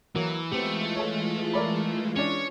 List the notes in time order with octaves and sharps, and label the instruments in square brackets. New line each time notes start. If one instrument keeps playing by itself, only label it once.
[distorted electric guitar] E3 [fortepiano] F#3 A#3
[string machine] E3 G#3 F4 [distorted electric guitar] A3 [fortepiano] B3 C4 G4
[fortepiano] A4 C#5
A#4 D5 B5
[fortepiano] C#4 D4 [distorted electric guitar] C#5